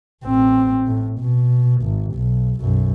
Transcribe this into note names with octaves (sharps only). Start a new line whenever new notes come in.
A1 C4
A2
B2
G#1
B1
B1 F#2